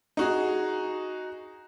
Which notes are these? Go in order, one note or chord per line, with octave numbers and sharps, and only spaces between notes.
D#4 F#4 G#4